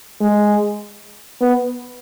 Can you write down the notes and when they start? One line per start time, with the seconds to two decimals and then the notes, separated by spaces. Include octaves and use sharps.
0.21 G#3
1.41 B3